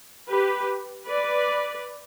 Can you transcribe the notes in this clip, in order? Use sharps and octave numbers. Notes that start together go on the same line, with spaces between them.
G4 B4
B4 D5